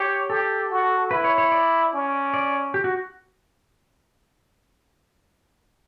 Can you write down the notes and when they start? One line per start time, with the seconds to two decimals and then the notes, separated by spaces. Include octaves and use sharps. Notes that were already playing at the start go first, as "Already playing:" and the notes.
Already playing: G4 C#5
0.30 G4 A4
0.71 F#4
1.11 E4 B4
1.24 C#5
1.38 C#5
1.52 D5
1.93 C#4
2.34 D5
2.74 G4
2.84 F#4